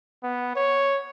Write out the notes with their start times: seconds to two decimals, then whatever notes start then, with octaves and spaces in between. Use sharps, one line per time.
0.24 B3
0.56 C#5